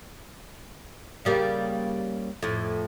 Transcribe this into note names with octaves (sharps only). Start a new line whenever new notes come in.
C#3 G3 A#3
F2 A2